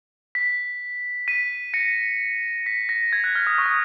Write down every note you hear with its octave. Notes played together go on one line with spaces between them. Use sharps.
B6
B6 D#7
A#6 C#7
B6
A#6
G#6
F#6
F6
D#6
C#6
D#6